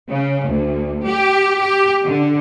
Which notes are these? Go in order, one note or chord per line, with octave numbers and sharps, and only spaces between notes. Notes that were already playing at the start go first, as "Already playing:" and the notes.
C#3
D2
G4
G4
D3